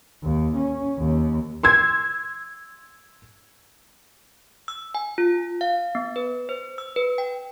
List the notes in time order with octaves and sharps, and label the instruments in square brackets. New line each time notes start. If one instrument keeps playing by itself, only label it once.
[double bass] D#2
C#4
D#2
[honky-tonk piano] C6 E6 G#6
[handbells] E6
G#5
F4
F5
B3
B4
C5
E6
B4
G5